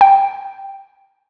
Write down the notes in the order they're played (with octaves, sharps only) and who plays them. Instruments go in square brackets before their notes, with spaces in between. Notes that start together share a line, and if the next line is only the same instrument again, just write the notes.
[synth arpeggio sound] G5